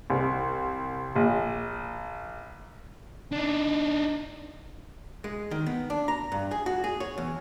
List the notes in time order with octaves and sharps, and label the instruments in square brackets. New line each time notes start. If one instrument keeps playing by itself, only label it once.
[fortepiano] C2
A#1
[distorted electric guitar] D4 D#4
[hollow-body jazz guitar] G#3
D#3
B3
D4
A#5
G2
G#4
F#4
G#4
C#5
E2